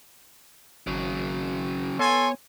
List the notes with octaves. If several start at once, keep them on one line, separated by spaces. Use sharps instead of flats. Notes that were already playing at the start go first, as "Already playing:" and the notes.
G#1 C#3 F#3
B3 A4 C#5 G#5 C6